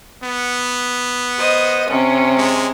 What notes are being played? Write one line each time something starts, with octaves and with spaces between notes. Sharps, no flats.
B3
C5 D#5
C3 C#4
G#3